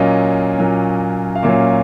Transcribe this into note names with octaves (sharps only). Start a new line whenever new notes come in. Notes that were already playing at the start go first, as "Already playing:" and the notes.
Already playing: A#2 F#3 A#3 C#4 D#5
A#2 F#3 A#3 C#4
F5
A#2 F#3 A#3 C#4 E5